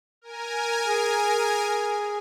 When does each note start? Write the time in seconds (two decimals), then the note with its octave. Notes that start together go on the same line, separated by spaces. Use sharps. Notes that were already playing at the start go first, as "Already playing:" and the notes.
0.22 A#4 G#5
0.86 G#4